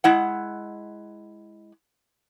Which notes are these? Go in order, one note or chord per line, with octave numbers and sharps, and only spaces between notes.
G#3 E4 F#5